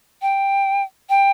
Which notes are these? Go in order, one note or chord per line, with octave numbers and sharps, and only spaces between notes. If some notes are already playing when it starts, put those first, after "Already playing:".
G5
G5